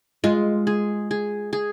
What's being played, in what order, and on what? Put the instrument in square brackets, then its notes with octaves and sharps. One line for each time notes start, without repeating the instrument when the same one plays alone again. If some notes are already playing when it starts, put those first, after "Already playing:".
[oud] G#3 [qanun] F4
[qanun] G#4
G#4
G#4